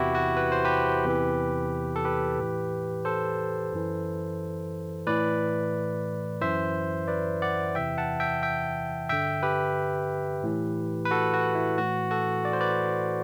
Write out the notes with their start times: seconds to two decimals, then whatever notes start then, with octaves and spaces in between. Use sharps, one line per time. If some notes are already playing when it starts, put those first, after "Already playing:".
Already playing: E2 C3 E3 E4 F#4 G4
0.15 F#4
0.37 B4
0.52 C5
0.65 G4 B4
1.04 E2 C3 E3
1.96 A4
2.05 G4 B4
2.39 A2 E3
3.05 A4 C5
3.72 F#2 E3
5.07 A2 E3 B4 D5
6.41 F#2 E3 C5 E5
7.08 B4 D5
7.42 D5 F#5
7.75 E2 C3 E3 E5 G5
7.98 F#5 A5
8.20 E5 G5
8.43 E5 G5
9.09 G2 D3 E5 G5
9.43 G4 B4
10.43 A2 E3
11.05 B4
11.11 F#4 A4
11.33 F#4
11.55 E4
11.78 A2 E3 F#4
12.11 F#4 A4
12.45 D5
12.53 C5
12.60 B4 D5